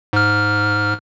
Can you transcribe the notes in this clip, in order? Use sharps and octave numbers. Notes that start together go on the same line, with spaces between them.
G#2 F6